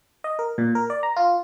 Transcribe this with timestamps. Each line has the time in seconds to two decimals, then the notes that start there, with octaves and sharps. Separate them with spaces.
0.24 D#5
0.39 A#4
0.58 A#2
0.75 A#4
0.90 D5
1.03 A#5
1.16 F4